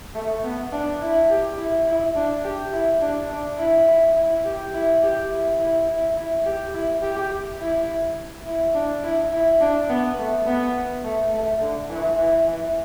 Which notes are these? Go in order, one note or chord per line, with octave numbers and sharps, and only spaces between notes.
A3
B3
D4
E4
G4
E4
E4
D4
G4
E4
D4
D4
E4
E4
E4
G4
E4
G4
E4
E4
E4
E4
G4
E4
G4
E4
E4
D4
E4
E4
D4
B3
A3
B3
A3
A3
D3
E3
E3
E3